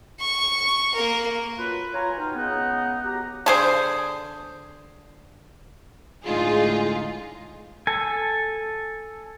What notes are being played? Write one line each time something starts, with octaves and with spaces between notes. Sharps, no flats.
C#6
A#3 A#4
F#2 F4 B4
F4 C#5 G#5 A#5
B2 D#4 F4 G5
C#2 B3 D#4 F#5
F#4 G4 A#5
D3 G#4 C5
A2 D3 G#3 D#4 F4 G#4
A4 G#5